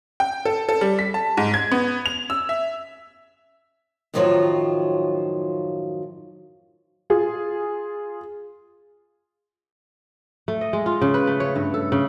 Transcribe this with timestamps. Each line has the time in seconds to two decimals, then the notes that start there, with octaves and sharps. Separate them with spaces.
0.20 G5
0.45 A4
0.69 A4
0.81 G3
0.99 B6
1.14 A5
1.37 G#2
1.54 G#6
1.71 B3
2.06 F7
2.30 E6
2.49 E5
4.14 F#2 A2 D#3 F3 F#3 F4
7.10 F4 G#4
10.48 A3
10.61 D#5
10.73 G#3
10.86 F4
11.02 C#3
11.14 B4
11.27 A3
11.40 C#5
11.56 G2
11.74 A4
11.92 C#3